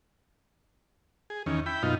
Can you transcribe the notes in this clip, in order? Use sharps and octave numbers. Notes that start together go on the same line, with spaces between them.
G#4
E2 D#3 C#4
E4 G5 B5
F#2 B2 D#4 F4